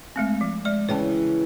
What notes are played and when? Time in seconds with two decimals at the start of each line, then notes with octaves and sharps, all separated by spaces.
0.16 G#3 A3 C4
0.41 F3
0.65 G#3 D5
0.89 C#3 E3 C#5 G5 A5